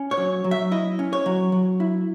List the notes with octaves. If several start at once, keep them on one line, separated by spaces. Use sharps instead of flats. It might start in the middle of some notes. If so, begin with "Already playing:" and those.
Already playing: C#4
C#5
F#3
F#3
E5
E4 D#5
C#4
C#5
F#3
F#3
E4